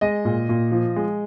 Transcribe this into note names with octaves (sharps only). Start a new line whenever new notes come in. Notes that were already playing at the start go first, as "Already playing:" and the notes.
G#3 D#5
A#2
A#2
F3
G#3